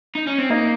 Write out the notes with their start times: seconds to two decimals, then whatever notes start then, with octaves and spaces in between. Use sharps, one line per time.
0.15 D#4
0.27 C#4
0.38 C4
0.50 A#3 D#4